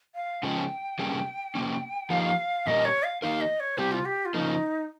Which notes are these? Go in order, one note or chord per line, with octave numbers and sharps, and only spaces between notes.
F5
C#3 F3 G#3 C#4 G5
C3 G3 A#3 C#4 G#4
C3 D#3 A#3 C#4
F3 A#3 D#4 G4 F5
A#2 G3 C#4 G4 A#4 D#5
C#5
F5
D#3 A#3 D#4 A#4 F5
D#5
C#5
C3 G3 C4 G4
F4
G4
F4
C#3 F3 A#3 D#4